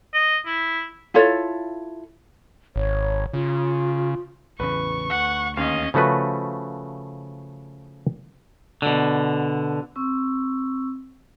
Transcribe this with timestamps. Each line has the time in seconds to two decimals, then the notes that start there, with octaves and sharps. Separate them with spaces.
0.14 D#5
0.46 E4
1.14 E4 F4 A4 C#5
2.76 G#1 C#5
3.34 C#3 F4
4.60 A1 E2 C#3 B4 C#6
5.10 D2 F#5
5.57 D#2 C#4 D#5 F5
5.94 C#3 F3 A3 F#4 B4
8.82 B2 D3
9.96 C4 C#6 E6